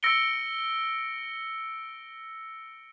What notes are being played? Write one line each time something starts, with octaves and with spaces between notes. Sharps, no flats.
E6 A#6 C#7 D7 G7